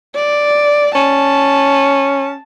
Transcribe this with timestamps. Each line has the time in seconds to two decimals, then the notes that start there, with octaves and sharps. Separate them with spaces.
0.15 D5
0.95 C#4 A5